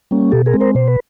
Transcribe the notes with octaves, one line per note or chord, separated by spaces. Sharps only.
G3 A#3 C#4
B2 G4 A4
G#4 A#4
G#3 C4
A#4 C5
B2 C5
B4